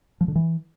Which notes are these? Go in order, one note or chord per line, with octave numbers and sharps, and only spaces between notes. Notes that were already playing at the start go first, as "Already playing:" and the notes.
F3
D3
E3